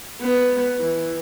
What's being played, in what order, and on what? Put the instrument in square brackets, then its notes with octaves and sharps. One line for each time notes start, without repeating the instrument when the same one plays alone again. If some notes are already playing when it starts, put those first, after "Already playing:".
[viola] B3
E3